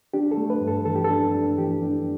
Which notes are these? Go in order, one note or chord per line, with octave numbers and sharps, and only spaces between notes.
D4 G4
A4
A3
B4
G2
A4
E3 A4
G4
A4
D4
D4
E3 G4
D4